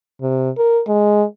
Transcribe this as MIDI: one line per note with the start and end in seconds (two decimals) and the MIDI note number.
0.22 0.50 48
0.57 0.81 70
0.88 1.25 56